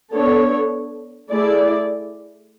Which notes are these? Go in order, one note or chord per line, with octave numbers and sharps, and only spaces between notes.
B3 D4 A4 C#5
A3 E4 G#4 D5